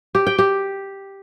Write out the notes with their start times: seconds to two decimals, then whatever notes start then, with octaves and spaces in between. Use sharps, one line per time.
0.15 G4
0.27 G5
0.38 G4